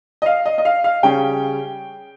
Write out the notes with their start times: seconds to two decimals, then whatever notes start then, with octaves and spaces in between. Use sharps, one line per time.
0.22 D#5
0.26 F5
0.46 D#5
0.58 D#5
0.65 F5
0.84 F5
1.03 C#3 G3 C#4 G5